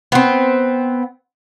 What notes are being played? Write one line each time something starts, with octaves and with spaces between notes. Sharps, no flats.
B3 C4